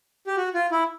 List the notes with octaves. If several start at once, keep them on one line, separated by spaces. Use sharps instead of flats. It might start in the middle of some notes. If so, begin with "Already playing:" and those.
G4
F#4
F4
E4